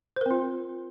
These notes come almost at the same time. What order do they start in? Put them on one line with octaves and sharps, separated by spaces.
C5 A#4 C4 F4